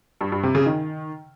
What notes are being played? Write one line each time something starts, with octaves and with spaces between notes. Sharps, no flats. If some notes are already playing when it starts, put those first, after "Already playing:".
G2
G2
C3
C#3
D#3